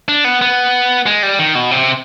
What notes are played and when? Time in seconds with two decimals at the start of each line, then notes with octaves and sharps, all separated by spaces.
0.08 D4
0.24 B3
0.42 B3
1.06 G#3
1.23 G3
1.39 D#3
1.55 B2
1.71 C3